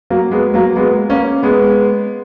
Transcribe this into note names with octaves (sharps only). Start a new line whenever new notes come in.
F#3 A#3
G#3 B3
F#3 A#3
G#3 B3
A#3 C#4
G#3 B3